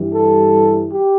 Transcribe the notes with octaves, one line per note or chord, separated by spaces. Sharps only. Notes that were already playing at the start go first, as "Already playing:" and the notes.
Already playing: G2 E3 G3
A4
G4